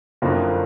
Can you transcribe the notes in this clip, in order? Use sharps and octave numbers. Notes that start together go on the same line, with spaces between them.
F#1 F2 D3 F3 A#3